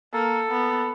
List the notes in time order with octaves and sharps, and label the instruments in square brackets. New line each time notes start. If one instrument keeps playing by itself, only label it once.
[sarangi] A#3 [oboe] A4
[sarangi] B3